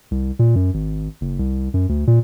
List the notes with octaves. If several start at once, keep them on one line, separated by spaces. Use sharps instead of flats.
C2
A#2
F#2
G#1
F#1
C2
F#2
D2
A#2